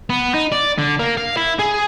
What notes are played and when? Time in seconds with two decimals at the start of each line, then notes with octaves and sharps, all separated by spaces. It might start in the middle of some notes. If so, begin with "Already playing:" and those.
0.10 B3
0.34 D#4
0.52 D5
0.78 D3
0.99 A#3
1.17 F5
1.37 E4
1.59 G#4